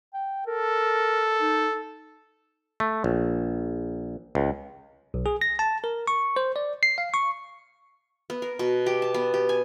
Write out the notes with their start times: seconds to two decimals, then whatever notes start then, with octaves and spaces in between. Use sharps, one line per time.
0.14 G5
0.47 A4 A#4
1.40 D#4
2.80 A3
3.04 A#1
4.35 C#2
5.14 B1
5.26 G#4
5.41 A#6
5.59 A5
5.84 A#4
6.07 C#6
6.36 C5
6.56 D5
6.83 C7
6.98 F5
7.14 C#6
8.30 B3
8.42 A#4
8.59 B2
8.86 G4
9.02 A5
9.14 B3
9.34 G4
9.49 G#5